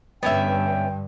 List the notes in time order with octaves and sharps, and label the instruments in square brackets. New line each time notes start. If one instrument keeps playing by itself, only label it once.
[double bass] G2 D3 [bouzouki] B3 C#4 E5 [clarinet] G5